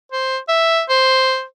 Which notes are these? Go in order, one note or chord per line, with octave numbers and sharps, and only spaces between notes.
C5
E5
C5